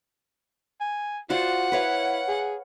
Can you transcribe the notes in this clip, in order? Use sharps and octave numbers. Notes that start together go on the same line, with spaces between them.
G#5
F4 F#4 C5 D5 F#5
E4 B4 C#5 F5
G#4